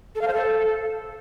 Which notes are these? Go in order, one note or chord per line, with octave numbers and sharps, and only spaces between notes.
A4
F5
C5
A4